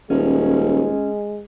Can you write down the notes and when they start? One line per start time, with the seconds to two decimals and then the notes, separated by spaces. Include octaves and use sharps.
0.10 D#1 G#3 C#4